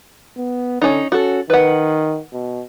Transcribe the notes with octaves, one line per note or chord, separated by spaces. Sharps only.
B3
D3 C#4 D#4
C#4 F#4 A4
D#3 B4 F#5
B2